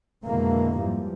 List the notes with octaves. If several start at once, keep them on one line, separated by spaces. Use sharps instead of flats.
F2 B2 D3 E3 G#3 A#3
G#2 E3 F3 G3